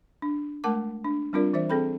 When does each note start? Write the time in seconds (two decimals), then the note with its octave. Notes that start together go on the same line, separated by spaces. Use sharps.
0.22 D4
0.64 G#3 A3 A#4 F#5 A5 D6
1.04 D4
1.33 G3 C4 D4 F4 A#4 D5
1.53 E3 C5 D5 E5
1.70 C4 G#4 A4 G5 B5